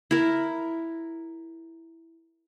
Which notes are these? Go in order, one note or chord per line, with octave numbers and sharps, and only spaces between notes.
E4 A#4